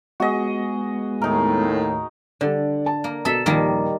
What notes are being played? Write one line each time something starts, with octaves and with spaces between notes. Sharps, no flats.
G#3 B3 F#4 G#4 D#5
D#2 A2 D#4 A#4
D3 G3 A4 D5
A5
A#3
B2 A4 E5
D#1 A#1 D#2 D#3 G3 A#3